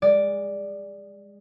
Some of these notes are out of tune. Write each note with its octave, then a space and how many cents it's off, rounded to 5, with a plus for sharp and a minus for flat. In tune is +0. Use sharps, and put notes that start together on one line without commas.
G#3 -25 D5 +0